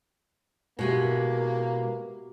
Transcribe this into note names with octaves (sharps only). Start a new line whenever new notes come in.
B2 G#3 A#3 E4 F#4 G4 G#5